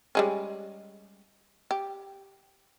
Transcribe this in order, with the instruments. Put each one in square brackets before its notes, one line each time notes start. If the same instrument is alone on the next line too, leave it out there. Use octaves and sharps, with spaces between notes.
[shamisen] G3 G#3 C#4
G4